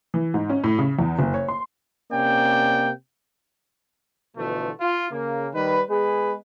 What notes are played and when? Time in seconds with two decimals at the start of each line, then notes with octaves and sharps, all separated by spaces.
0.14 E3
0.34 G#2
0.50 C#4
0.64 A2
0.79 C#3
0.99 E2
1.19 F#1
1.34 C#5
1.48 C6
2.12 C3 A#3 C#4 D5 G5
4.36 B2 D3 E3 F3 A3
4.79 F4
5.11 C#3 A#3
5.53 D#3 G3 B4
5.88 G#3 B3 G#4 B4